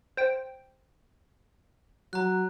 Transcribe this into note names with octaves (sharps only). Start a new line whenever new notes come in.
C5 G5
F#3 A#5 F#6